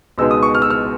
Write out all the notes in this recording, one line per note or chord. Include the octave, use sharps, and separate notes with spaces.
C#2 B2 G#3 B3 D#4 E6
D#6
C#6
F6
E6
F6